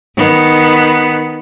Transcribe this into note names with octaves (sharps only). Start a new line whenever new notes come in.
D#3 B3